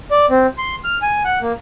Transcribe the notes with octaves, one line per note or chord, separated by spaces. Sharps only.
D5
C4
C6
F6
G#5
F#5
A#3